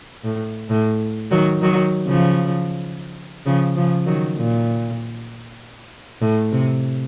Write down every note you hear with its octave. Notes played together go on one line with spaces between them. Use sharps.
A2
A2
D#3 F#3
D#3 F#3
C#3 F3
C#3 F3
C#3 F3
D#3 F#3
A#2
A2
C3